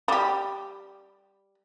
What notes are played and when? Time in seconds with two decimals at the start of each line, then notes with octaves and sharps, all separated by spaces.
0.08 G3 G4